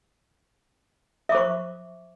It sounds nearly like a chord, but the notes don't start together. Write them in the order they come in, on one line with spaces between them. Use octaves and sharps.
E5 D6 C5 C#6